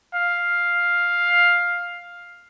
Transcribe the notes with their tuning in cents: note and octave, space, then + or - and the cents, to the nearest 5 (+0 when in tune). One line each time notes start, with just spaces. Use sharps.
F5 +5